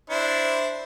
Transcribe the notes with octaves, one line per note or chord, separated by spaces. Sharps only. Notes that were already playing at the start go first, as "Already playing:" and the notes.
D4 E4 C5